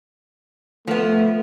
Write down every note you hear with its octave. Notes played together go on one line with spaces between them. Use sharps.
F3 A3 B3